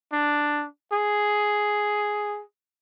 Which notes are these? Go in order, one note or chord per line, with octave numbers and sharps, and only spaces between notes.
D4
G#4